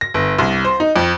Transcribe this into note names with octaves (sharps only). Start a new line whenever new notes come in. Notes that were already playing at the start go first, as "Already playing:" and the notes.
A#6
G1
C2
C5
D#4
F2